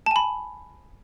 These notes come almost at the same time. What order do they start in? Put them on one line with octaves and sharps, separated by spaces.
A5 G#5 B5